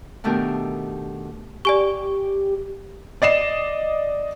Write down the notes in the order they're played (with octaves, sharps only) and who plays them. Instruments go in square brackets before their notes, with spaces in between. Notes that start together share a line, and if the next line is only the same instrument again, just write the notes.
[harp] B2 D#3 A3 D4 G4 A#4
[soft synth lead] G4 [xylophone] D5 G#5 C#6
[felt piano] D5 D#5 C7 E7